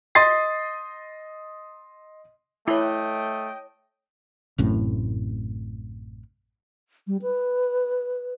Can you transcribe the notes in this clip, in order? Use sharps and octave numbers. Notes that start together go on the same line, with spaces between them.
D#5 C6 D#6 A6 C7
A3 E4 C#5 D#5 G5 D6
A1 F#2 A2 C3
G3
B4